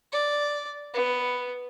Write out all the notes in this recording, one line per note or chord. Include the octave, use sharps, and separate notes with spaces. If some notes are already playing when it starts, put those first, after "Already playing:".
D5
B3